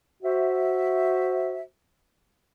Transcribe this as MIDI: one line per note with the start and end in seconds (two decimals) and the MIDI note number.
0.23 1.61 66
0.23 1.61 72
0.23 1.61 76